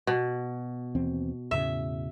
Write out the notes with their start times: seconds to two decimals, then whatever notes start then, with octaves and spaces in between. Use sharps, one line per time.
0.07 B2
0.95 D#2 E3 C4
1.51 E2 A2 C#3 E5